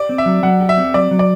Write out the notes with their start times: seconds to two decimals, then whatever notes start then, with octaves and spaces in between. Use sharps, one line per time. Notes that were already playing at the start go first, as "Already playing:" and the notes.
Already playing: G4 D5
0.09 C4
0.18 E5
0.26 F#3
0.43 F#3 F#5
0.61 G4
0.69 E5
0.77 C4
0.94 F#3 D5
1.11 F#3
1.19 D5